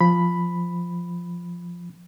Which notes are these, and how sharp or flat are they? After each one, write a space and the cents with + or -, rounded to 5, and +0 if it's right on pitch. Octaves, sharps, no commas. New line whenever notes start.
F3 +0 B5 +0